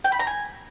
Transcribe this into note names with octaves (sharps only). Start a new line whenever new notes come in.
G5
B5
A#5
G#5